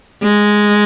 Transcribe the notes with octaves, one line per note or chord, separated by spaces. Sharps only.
G#3